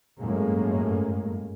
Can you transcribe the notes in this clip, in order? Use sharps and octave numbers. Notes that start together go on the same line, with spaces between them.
G1 F#2 A2 G#3 A#3